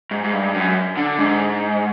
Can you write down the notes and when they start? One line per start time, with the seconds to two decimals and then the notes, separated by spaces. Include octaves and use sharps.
0.11 G#2
0.24 G#2
0.33 G2
0.54 F#2
0.97 D3
1.19 G#2